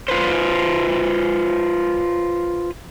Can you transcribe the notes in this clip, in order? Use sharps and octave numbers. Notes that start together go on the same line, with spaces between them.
F4 B4 C5